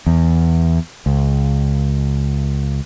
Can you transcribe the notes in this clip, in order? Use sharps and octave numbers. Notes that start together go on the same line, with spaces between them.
E2
C#2